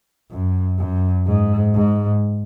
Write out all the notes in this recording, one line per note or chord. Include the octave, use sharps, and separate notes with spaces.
F#2
F#2
G#2
G#2